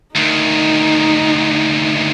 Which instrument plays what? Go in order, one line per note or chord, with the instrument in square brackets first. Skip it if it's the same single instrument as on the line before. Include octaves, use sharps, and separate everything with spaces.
[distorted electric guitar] D2 D#3 [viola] D#4